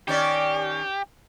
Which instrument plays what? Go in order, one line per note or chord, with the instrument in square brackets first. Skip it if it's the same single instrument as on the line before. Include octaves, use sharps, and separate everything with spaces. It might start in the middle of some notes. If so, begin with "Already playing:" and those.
[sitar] D#3 C#4 D5 [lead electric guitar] G4